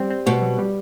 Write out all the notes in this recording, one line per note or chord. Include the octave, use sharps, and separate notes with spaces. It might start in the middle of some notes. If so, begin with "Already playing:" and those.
Already playing: G3 C4
C4
B2 F#4
F#3
G3